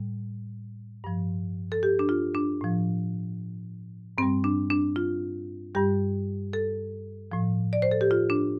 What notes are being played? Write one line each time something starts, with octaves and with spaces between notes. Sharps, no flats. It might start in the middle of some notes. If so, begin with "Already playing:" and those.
Already playing: A2 G3
G2 F3
A4
G4
D4
F4
D4
A2 F3
G2 G3 C4
D4
D4
F4
G2 G3 G4
A4
A2 F3
D5
C5
A4
G4
F4
D4